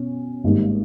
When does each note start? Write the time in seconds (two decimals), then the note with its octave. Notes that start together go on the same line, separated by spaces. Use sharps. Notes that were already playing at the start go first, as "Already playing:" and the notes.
Already playing: B2 C#4
0.44 G#1 G#2 G3 A#3